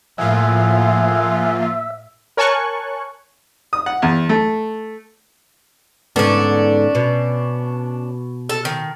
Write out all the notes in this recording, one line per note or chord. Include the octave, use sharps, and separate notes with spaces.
A2 F3 A#3 F4 G#4 E5 F#5 G#5
A#4 C#5 G#5 A5 C#6 F#6
D#6
F#5
E2
A3
G#2 D3 B3 C#4 D4
B2
A4
D#3